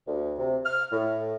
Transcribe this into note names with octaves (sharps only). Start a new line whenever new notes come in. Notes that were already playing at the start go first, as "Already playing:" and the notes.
D2
C3
F6
A2